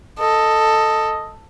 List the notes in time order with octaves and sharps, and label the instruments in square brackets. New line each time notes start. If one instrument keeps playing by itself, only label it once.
[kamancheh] A4 [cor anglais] D#5